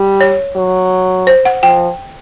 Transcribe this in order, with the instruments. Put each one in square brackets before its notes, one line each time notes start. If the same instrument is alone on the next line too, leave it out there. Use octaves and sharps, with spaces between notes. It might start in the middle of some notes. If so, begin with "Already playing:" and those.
Already playing: [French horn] G3
[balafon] C#5
[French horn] F#3
[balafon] C5
F#5
[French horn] F3 [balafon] G5